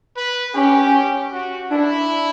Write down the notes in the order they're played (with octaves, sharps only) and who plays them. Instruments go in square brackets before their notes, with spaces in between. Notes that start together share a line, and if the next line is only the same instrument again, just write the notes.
[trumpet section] B4
[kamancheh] C#4 [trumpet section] G4
[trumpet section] F#4
[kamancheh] D4 [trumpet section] E4